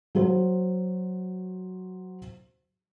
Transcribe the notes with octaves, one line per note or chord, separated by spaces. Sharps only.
F#3 F#4 C5